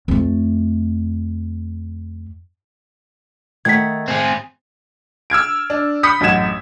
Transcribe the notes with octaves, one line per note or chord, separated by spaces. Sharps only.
F2 A3
D#3 A3 F#5 G#6 B6
C4 G#4
E6 F6 G#6 D7
D4
B5 D#6 G6 B6 C#7
A1 F#2 D#4 F#5 G#6 E7